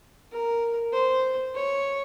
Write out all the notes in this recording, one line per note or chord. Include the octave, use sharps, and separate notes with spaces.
A#4
C5
C#5